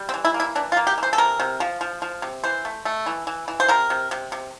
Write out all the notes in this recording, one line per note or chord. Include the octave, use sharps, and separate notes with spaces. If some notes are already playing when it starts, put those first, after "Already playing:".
Already playing: G3
C4
E3
E4
A#3
E4
E3 D4
F4
A#3
G4
E3
C5
A4
C3 A#4
C3
F3
F3
F3
C3
E3 C5
A3
A3
E3
E3
E3
C5
C3 A#4
C3
C3
C3